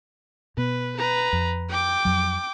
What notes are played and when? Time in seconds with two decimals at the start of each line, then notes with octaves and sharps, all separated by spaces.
0.57 B2 B3 B4
0.97 B4 A#5
1.33 F2
1.69 G5 D6
2.05 F2 F#3